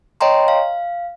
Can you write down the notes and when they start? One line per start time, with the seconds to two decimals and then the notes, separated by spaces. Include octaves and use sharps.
0.21 C#5 D#5 G5 A#5 C6
0.48 F5